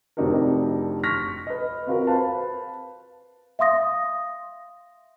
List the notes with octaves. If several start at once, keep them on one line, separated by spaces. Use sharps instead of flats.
F1 C4 D4 D#4 F#4 A#4
C6 C#6 F6 A#6 B6
B4 D#5
C4 F4 F#4 A#4
B4 C5 F5 A5
E5 F5 C6 D#6 A#6